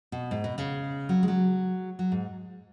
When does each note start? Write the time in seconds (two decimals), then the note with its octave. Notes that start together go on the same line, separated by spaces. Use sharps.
0.12 B2
0.31 G#2
0.44 B2
0.58 C#3
1.09 F#3
1.23 G#3
1.28 F#3
1.99 F#3
2.12 G#2